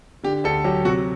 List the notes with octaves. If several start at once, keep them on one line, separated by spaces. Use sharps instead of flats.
D3 G4
D2 A4
F#3 G4
C3 F#4